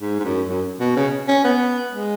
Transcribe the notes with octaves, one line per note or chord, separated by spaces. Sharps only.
G#2
G#2
F#2
F#2
B2
C#3
C#4
B3
G#3